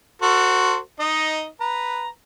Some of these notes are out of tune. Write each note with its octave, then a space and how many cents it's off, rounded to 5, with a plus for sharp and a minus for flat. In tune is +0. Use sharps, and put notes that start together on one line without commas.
F#4 +0 A4 +40 C5 +0
D#4 +5 D#5 +0
B4 +0 A#5 +0